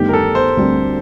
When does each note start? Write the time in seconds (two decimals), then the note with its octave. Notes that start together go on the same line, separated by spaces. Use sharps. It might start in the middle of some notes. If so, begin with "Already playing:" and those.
Already playing: G1 G2 D#3 A3 G4
0.09 A#4
0.13 A4
0.35 C5
0.57 D2 D3 G3 C4